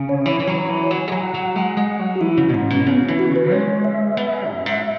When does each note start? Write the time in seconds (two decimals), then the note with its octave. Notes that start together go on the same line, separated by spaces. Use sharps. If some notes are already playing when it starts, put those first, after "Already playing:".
Already playing: C#3
0.09 C#5
0.26 E3 C#5
0.40 E3
0.47 F#3
0.58 C#5
0.69 E3
0.91 F#3 G#5
1.08 G#3
1.12 F#3
1.23 F#5
1.35 F#3
1.56 G#3
1.77 G#3
1.99 F#3
2.15 F#4
2.21 E3 E4
2.38 C#3
2.49 B2
2.54 G#2 C#4
2.70 B2
2.87 C#3 B3
3.03 C#4
3.08 E3
3.19 F#4
3.30 C#3
3.36 B4
3.52 G#3 C#5
3.84 E5
4.17 B3
4.33 G#3
4.50 F#2
4.66 G#2